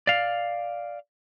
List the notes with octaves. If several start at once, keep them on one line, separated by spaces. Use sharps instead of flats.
D5 F5